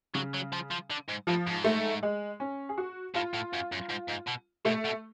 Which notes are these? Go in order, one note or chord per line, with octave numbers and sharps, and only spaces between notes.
C#3 F#3
F#3
F3
F3
D3
G#2
A2 F3
G#2
A3
G#3
C#4
G#4
F#4
A2 F4
A2
F#2
F#2
G#2
G#2
B2
B2 A3
B2